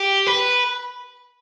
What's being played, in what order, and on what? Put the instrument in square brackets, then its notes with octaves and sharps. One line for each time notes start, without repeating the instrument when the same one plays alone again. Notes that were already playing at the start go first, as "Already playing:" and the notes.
Already playing: [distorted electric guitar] G4
B4